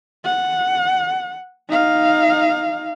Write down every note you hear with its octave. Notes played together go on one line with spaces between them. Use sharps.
F#5
D#4 F5